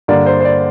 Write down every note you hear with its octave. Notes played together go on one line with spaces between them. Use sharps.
G2 D3 A#3 D5
C5
C5
D5